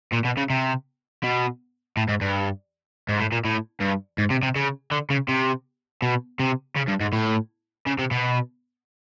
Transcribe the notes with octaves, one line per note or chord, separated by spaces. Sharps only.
A#2
B2
C#3
C3
B2
A2
G#2
G2
G#2
A2
A#2
A2
G2
G#2
C3
C3
C#3
D3
C#3
C3
B2
C3
C#3
G2
G#2
A2
C#3
C3
B2